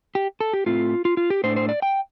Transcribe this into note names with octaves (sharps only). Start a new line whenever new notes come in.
G4
A4
G4
A2 A3 C4 F4
F4
F4
G4
A2 A3 D4 C5
C5
D5
G5